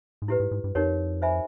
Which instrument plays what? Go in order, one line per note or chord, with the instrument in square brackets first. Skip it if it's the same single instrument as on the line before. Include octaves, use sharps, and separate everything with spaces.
[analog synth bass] G#2
[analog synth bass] A2 [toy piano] E4 G4 B4
[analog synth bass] G#2
G#2
G2
[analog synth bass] F2 [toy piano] D#4 G4 A#4 C#5
[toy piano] C5 E5 G#5 B5